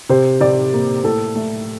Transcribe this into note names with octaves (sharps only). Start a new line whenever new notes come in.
C3 C5
C3 D5
A#3
A2 A4
A3